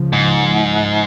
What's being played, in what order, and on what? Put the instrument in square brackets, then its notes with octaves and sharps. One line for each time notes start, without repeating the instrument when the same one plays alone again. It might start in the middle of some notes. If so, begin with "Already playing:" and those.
Already playing: [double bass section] C#2 C#3 F3
[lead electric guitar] G#2